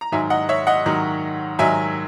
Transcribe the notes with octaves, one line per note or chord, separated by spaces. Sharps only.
A#5
G#2 D#3 F#3 E5 G#5
D#5 F#5
C#5 E5
D#5 F#5
G#2 D#3 F#3
G#2 D#3 F#3 E5 G#5